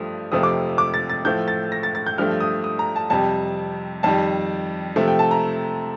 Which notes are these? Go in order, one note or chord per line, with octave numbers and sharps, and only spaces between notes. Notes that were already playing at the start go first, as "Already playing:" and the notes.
Already playing: G2 F3 A3 D#6
F2 C3 F3 A3 D#6
D6
D6
A6
A6
A2 F3 A3 G6
A6
A#6
A6
A6
G6
G2 F3 A3 F6
D#6
D#6
A#5
A5
F2 C3 G3 A5
F2 D#3 G3 A5
C3 F3 A3
G5
A5
A#5